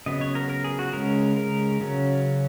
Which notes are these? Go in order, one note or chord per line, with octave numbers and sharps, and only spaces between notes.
C#3 F#3 B3 D#5
C#5
A#4
A#4
G#4
F#4
C#3 G#3 C#4 A#4
A#4
C#3 F#3 C#4